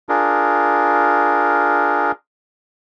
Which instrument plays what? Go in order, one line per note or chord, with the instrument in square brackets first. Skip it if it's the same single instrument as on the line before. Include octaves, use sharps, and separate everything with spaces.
[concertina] D4 F4 G#4 A#4